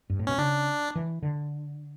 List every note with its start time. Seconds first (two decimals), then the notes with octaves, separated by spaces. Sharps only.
0.10 G2
0.19 A2
0.27 B2 C#4
0.38 C#3 D4
0.96 E3
1.23 D3